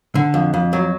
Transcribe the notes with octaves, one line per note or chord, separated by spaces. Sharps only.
D3
F2
F2
F#3